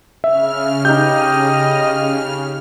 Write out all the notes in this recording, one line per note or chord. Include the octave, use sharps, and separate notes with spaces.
C#3 E5 F6
D#4 G4 D#5 G6